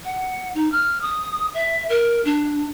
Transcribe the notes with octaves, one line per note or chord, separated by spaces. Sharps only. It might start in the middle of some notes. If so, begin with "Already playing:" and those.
F#5
D#4
F6
D#6
E5
A#4
D4